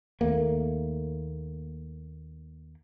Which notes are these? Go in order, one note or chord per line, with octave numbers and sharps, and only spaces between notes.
D#2 A3 A#3